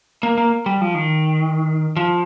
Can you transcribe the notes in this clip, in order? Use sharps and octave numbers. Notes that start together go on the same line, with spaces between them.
A#3
A#3
G3
F3
D#3
F3